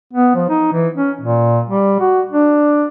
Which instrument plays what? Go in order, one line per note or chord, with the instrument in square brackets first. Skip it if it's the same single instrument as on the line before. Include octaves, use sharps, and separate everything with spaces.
[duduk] B3
F3
D#4
E3
C#4
A#2
G3
F#4
D4